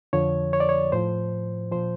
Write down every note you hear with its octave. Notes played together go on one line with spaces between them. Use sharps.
F2 D3 F3 C#5
C#5
D5
C#5
A2 F3 C5
A#2 F3 C5